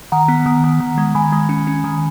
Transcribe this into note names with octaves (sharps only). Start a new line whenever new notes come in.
D#3 F#5 A#5
B3
D#3
D#3
D#3
G#3
D#3 G#5 B5
G#3
C#4
C#4
D#3